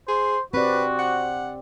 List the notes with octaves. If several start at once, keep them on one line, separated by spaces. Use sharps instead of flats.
G#4 C5
C4 F#4 G4 B4 D5
F#5